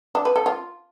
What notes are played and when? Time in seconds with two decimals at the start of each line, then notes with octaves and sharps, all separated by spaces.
0.15 D4
0.25 B4
0.36 A4
0.46 F4